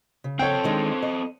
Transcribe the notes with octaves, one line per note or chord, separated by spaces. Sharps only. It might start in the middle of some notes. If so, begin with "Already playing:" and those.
C#3
C4 A4 C#5 G5
D#3 G#3 D4
D#5